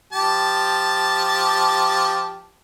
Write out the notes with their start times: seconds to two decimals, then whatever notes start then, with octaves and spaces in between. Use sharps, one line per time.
0.13 F3 G4 A5